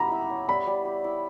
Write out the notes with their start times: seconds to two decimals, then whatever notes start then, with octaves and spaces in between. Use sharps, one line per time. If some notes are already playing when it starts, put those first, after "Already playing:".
Already playing: B3 G4 E5 A#5
0.12 E4
0.30 C#5
0.48 G3 B5
0.67 G3
0.85 G4
1.04 E4